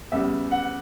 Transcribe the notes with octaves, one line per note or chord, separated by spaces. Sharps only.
E2 C#3 G3 E5
F#5